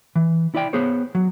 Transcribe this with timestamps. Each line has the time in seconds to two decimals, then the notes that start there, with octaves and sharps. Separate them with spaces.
0.16 E3
0.55 E4 D5 G5
0.73 B3 G#4 C5 C#5
1.15 F#3